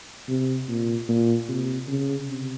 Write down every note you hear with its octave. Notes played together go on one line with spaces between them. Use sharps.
C3
A#2
A#2
C3
C#3
C3